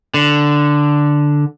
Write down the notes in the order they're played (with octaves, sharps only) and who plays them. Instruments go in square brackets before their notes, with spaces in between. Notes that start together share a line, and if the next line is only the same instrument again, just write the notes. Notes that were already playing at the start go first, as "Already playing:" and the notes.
[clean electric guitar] D3